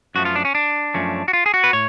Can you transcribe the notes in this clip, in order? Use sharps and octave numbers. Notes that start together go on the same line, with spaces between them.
F#2 F3 A3 F#4
F4
D4
C#4
D4
F#2 F3 A3 C#4
F#4
F4
G#4
F#4
B4
A2 C#5